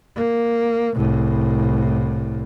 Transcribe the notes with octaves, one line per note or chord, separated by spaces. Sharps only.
A#3
C2 A2